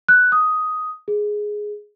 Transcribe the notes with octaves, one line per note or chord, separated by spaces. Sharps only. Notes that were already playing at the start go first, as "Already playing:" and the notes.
F#6
D#6
G#4